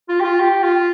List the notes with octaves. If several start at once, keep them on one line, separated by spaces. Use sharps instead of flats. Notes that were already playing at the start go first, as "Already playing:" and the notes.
F4
G4
F4
G4
F4